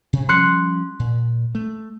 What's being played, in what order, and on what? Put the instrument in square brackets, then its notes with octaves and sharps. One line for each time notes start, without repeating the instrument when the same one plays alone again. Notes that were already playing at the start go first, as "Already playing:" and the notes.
[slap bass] C3
[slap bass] F3 G3 C#4 [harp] C6 F#6 C#7
[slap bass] A#2
A3